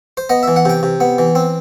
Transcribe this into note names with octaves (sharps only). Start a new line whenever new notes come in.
C5
B3 D#5
E3 E5
F#5
C3 G5
C3
B3
E3
C4